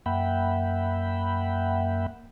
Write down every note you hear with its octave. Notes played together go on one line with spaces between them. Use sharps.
F#2 A#3 E5 F#5 G5 B5